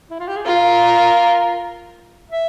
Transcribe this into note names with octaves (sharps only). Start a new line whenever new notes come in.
E4
F4
G4
G#4
F4 A#4
E5